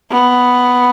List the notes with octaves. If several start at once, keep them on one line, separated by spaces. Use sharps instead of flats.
B3